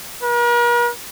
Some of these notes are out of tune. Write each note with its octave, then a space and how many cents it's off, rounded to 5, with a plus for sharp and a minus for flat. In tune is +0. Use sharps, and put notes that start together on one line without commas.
A#4 +45